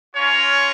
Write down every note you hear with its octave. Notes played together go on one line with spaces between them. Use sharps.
C#4 F4 A#4 C#5